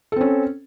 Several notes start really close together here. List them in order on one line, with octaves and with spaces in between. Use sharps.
A4 C4 C#4